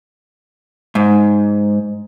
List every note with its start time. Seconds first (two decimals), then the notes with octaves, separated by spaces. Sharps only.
0.95 G#2